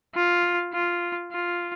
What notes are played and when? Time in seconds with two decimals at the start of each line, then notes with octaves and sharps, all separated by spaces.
0.15 F4
0.73 F4
1.32 F4